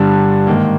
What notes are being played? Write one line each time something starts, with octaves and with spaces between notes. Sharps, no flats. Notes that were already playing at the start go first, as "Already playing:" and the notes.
Already playing: G2 D3 G3 D4
G#2 D#3 A#3